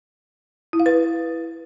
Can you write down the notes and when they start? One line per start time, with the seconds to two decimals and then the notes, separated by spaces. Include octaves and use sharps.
0.73 E4
0.80 F5
0.86 B4